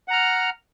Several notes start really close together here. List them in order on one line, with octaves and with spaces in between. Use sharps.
F#5 A#5 F6